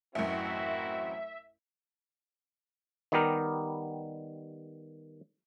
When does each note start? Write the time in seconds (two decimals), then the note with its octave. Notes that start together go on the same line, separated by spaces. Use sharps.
0.15 A1 F#2 C4 E4 F#4 E5
3.12 D#3 G3 B3 G4 A#4